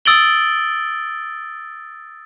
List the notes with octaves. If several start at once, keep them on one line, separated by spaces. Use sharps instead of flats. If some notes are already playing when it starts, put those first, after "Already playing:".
D#6 E6 A6 D7 F#7 G7